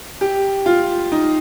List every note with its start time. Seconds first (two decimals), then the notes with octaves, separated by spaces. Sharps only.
0.21 G4
0.66 F4
1.12 D#4